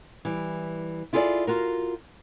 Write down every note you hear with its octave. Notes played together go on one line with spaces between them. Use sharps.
E3 G3
E4 F4 G#4 A4 C#5 D5
F4 F#4 A#4